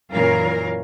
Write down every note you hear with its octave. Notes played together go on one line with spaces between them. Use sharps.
F#2 A#2 E3 C#4 A#4 F5